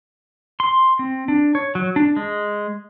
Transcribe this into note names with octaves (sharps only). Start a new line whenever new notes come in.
C6
C4
D4
C#5
F#3
D4
G#3